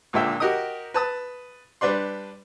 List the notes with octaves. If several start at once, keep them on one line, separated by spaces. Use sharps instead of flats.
C#2 A#2 D3 E5 G5
F#4 G4 A#4 D#5 D#6
B4 A5 D#6
G3 D4 B4 D5 C6